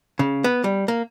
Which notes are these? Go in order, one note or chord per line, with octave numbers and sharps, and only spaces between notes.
C#3
B3
G3
A#3